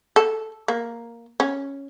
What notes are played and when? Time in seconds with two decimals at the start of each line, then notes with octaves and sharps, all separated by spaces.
0.16 A4
0.68 A#3
1.40 C#4